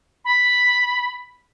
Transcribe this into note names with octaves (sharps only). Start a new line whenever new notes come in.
B5